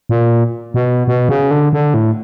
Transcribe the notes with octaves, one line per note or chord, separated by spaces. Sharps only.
A#2
B2
B2
C#3
D3
D3
A2